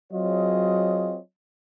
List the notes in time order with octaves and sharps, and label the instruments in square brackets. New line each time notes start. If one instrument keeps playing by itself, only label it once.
[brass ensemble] F#3 C4 F4 G#4 C#5 D#5